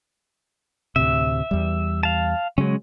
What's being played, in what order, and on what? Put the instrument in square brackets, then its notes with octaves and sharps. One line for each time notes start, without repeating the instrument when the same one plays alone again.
[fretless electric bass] D2 A2 C3 [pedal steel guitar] E5
[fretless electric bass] E2 G3
[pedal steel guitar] F5 A5
[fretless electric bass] C#3 F#3 [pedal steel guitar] G#3 C#4